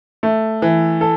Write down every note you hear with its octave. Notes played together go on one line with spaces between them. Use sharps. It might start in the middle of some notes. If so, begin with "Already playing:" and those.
A3
E3
A4